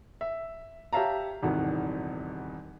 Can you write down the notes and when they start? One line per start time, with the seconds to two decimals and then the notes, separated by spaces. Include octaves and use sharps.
0.21 E5
0.93 G4 C#5 E5 F5 A5 A#5
1.42 D#1 G#1 E2 C3 D#3 F#4